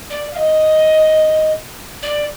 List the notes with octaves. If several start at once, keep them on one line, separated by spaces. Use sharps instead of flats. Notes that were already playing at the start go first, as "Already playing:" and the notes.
D5
F5
D#5
D5